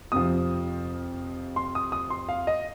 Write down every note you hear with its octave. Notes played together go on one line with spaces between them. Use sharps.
F2 C3 F3 D#6
C6
D#6
D#6
C6
F5
D#5